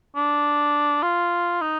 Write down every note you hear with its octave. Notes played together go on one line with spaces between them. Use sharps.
D4
F4
D#4